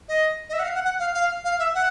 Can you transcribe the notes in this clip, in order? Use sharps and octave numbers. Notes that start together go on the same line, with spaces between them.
D#5
D#5
E5
F#5
F5
F#5
F#5
F5
F5
F5
E5
F#5